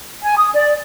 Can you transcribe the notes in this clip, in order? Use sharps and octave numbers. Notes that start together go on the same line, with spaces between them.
G#5
D#6
D5